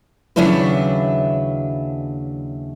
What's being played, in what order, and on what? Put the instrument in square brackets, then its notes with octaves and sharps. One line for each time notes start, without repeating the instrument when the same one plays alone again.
[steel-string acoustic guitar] D#2 C#3 F#3 D4 E4 B4